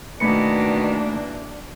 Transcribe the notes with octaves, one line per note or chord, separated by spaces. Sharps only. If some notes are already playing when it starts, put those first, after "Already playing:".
B2 D#3 E3 A3 A#3 D4 B5 C#7